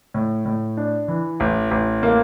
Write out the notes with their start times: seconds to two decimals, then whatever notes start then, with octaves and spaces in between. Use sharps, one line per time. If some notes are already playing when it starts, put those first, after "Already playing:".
0.14 A2
0.45 A2
0.77 D4
1.08 E3
1.40 A1
1.71 A1
2.03 A#3